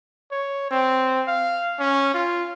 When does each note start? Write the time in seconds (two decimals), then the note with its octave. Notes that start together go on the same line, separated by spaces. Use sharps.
0.32 C#5
0.71 C4
1.28 F5
1.80 C#4
2.14 F4